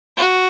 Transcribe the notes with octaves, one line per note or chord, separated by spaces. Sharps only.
F#4